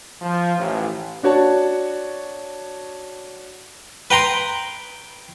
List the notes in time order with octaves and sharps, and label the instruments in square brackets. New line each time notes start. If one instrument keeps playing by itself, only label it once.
[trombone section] F3
A1
[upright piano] D4 F#4 C#5 A5
[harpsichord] B4 G5 A#5 C6